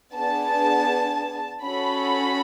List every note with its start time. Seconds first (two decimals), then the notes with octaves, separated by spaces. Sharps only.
0.14 B3 D4 G#4 A5
1.64 C#4 F#4 A4 B5